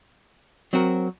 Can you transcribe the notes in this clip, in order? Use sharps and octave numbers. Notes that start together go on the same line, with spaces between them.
F#3 C4 F#4 A#4